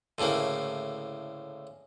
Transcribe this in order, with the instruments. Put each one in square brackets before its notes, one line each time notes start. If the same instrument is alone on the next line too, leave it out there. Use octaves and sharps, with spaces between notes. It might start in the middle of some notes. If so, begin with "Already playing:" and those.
[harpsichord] D2 A2 C#3 A#3